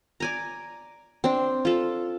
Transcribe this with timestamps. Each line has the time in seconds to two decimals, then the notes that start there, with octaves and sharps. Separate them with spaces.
0.20 D5 G#5 A#5
1.24 C4 D4
1.65 F4 A4